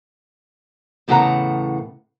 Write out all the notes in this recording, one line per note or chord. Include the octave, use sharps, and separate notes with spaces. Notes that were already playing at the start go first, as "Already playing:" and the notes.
E2 A2 C#3 A4 F#5 A#5